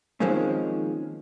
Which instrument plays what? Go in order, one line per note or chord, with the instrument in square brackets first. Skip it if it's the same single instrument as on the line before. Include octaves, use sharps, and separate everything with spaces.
[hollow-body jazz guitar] D#3 F3 G#3 A#3 C4 C#4